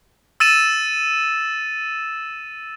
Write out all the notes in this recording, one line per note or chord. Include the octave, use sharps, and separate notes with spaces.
E6 A6 D#7 E7